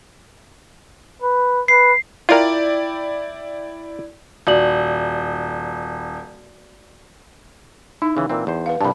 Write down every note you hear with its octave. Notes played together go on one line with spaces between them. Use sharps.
B4
B4 C7
E4 F4 A#4 D5 G5
D#1 F#4 D5 F#7
D#4 E4
C#3 E3
A#2 E3 C4
E2 C5
B4 F5
C2 G2 A5 B5